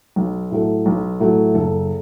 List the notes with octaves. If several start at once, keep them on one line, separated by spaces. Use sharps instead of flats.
B1
A2 F#3 A3
B1
A2 F#3 A3
F#1 A4